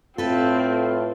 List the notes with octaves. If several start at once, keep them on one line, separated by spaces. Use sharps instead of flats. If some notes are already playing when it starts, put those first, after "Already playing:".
A2 C4 F4 A4 B4